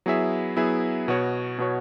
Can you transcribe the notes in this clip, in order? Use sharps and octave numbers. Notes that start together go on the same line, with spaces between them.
F#3 B3 E4 G#4 E5
F#3 B3 E4 G#4 E5
B2 B3 F#4 C#5
B2 B3 F#4 C#5